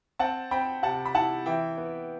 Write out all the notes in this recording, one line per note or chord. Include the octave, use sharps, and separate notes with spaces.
C4 F#5 A5
C4 G5 B5
C3 F#5 A5
B5
E4 F#5 A5
E3 E5 G5
B3